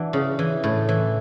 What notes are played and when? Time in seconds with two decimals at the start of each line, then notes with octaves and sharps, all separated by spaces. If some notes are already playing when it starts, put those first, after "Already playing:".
Already playing: E3 D4 F#4
0.13 C#3
0.39 E3
0.64 A2
0.89 E3